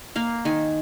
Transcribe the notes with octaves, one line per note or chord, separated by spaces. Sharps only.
A#3 F5
D#3 G#5